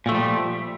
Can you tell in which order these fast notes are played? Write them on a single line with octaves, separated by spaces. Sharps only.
A#2 A3 F3 G3